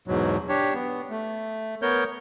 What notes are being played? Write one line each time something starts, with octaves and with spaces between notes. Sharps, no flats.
E2 G#2 B2 F#3
D4 G4 C#5
B3
A3
B3 A#4 C#5 G6